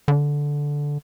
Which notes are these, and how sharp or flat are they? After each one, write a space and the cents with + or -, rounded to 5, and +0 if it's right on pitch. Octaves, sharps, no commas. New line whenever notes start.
D3 -10